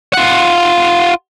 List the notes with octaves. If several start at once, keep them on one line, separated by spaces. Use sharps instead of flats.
F4 F#5